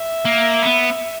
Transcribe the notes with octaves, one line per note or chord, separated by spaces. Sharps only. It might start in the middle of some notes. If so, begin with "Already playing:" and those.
Already playing: E5
A#3
B3